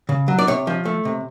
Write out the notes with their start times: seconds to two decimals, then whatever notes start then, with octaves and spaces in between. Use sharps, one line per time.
0.09 C#3
0.28 F#3
0.39 D5
0.47 C3 C#5
0.67 F3
0.85 A3
1.05 C3